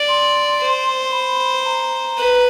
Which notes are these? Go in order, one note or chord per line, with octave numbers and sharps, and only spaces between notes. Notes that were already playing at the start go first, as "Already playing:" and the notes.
Already playing: D5
C6
C5
B5
A#5
B4